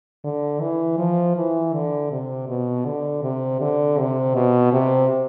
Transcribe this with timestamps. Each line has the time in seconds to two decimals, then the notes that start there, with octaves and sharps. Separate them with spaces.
0.24 D3
0.61 E3
0.98 F3
1.36 E3
1.73 D3
2.11 C3
2.48 B2
2.85 D3
3.23 C3
3.61 D3
3.98 C3
4.35 B2
4.73 C3